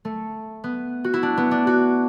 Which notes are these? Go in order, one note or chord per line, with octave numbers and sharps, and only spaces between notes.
A3
B3
F#4
E4
D4
B3
D4
F#4